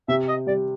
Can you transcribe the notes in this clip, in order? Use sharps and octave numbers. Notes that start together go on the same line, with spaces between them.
C3 E5
D#5
G3 D5